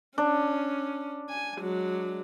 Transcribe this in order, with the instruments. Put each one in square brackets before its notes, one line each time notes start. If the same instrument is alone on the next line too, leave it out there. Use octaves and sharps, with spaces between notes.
[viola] C#4 [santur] D4
[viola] G#5
F#3 G#3